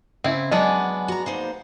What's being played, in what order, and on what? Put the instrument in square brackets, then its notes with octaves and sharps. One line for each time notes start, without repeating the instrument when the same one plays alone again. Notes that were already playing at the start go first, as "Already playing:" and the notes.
[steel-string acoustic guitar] C#3 [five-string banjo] C4 E4
[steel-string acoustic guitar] F#3 F#5 G#5 [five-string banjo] G#3 B3 D4
[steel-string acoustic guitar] F#4 A#5
A#3 D#4 C5